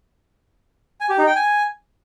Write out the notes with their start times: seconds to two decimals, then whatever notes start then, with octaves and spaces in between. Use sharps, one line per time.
1.01 G#5
1.09 G4
1.18 D#4
1.27 G5
1.36 G#5